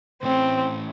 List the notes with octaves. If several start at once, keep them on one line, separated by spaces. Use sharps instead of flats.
A2 E3 A3 C4 C#4